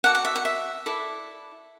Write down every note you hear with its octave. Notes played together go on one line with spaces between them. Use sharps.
F#4 A4 D5 F#5
F#5
E5
F#5
E5
E4 A4 D5